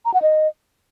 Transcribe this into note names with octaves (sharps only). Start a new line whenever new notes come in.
A#5
F#5
D#5